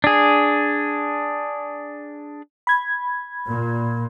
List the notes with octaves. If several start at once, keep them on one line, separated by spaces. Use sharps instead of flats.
D4 G#4
B5 G#6
A#2